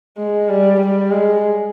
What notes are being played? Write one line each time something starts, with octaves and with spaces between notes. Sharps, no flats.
G#3
G3
G3
G#3